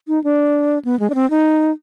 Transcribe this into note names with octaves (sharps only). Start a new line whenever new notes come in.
D#4
D4
B3
G#3
D4
C4
D#4